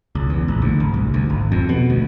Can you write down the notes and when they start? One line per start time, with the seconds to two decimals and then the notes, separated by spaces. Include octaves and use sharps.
0.15 C#2
0.30 E2
0.48 A#1
0.62 D2
0.80 G#1
0.94 C2
1.14 D2
1.30 G#1
1.52 F2
1.69 B2
1.90 D2